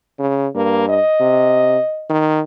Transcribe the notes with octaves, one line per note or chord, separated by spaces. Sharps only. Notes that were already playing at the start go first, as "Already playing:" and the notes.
C#3
G2 A#3
D#5
C3
D#3